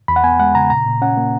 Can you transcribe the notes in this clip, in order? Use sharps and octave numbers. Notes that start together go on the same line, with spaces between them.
E2 B5
F#5
B3 G#5
G#3 F#5
C#3 A#5
A#2 A#5
A#2
C#4 F#5
A#3